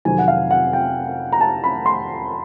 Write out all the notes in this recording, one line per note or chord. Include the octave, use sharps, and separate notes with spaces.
F2 C3 D#3 F#3 G#5
F#5
F5
F#5
G5
A#5
A5
B5
C6